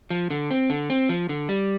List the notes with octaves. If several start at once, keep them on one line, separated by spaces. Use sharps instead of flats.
F3
D3
C4
D3
C4
F3
D3
G3